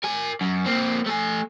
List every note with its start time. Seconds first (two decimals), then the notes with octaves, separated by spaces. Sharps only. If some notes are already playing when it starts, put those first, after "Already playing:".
0.04 A#4 G#5
0.41 F#2
0.66 A#3 C4
1.06 A3 G#5